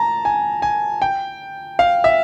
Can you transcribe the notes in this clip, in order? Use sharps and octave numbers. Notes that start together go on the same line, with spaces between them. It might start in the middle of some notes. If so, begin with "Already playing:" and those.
Already playing: A5 A#5
G#5
G#5
G5
F5
E5